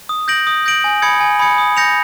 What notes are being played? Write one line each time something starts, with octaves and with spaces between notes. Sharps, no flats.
D#6
G6 A#6 D7 F#7
D#6
G6 A#6 D7 F#7
G#5
B5 D#6 G#6 C#7
G#5
B5 D#6 G#6 C#7
D#6
G6 A#6 C#7 F7